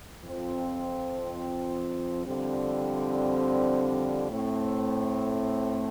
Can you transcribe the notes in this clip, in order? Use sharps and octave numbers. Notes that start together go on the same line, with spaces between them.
F2 F3 C4
F2 D3 G3 C4
A2 A3 C4